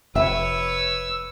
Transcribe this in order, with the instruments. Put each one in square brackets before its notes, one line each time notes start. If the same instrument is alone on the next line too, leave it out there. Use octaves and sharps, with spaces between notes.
[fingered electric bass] F1 [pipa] C4 E5 [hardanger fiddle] B4 C#5 [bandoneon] E6